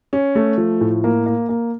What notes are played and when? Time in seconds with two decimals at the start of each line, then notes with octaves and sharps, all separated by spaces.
0.13 C#4
0.35 A3
0.58 F3
0.81 A2
1.04 A#3
1.26 A#3
1.49 A#3